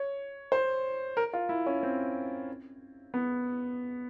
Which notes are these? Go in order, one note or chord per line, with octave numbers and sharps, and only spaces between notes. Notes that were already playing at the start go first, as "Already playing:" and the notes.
Already playing: C#5
C5
A#4
F4
E4
C#4
C4
B3